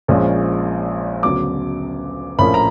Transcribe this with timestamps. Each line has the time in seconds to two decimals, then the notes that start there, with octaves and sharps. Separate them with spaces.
0.08 A#1 A#2 F3 G#3 C#4
1.23 D2 C#3 F#3 B3 D6
2.38 A#1 A2 F3 A#3 C#4 B5
2.54 A#5